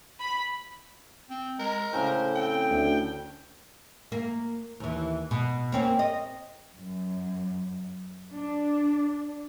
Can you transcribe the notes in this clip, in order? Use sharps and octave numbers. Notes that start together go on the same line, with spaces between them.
B5
C4
G#3 A#4
A2 C#3 C5
C4 G5
D2
A#3
D#2 E3
B2
A#3 C4 C#4
D#5
F#2
D4